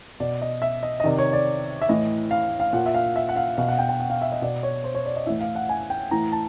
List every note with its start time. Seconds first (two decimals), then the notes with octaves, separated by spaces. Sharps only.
0.20 B2 D5
0.41 D#5
0.62 E5
0.83 D#5
1.00 D#5
1.04 C3 D#3 D5
1.18 C#5
1.33 D5
1.82 E5
1.89 A2 E3 D#5
2.31 F5
2.60 F5
2.73 A#2 F#5
2.86 E5
2.94 F5
3.16 E5
3.29 F#5
3.36 F5
3.58 B2 F5
3.68 F#5
3.79 G5
3.89 G5
4.00 F#5
4.10 F5
4.22 E5
4.32 D#5
4.42 B2 D5
4.63 C#5
4.84 C5
4.95 C#5
5.06 D5
5.16 D#5
5.26 A2 E3 E5
5.41 F5
5.55 F#5
5.69 G#5
5.90 G5
6.11 A2 E3 A#5
6.32 A5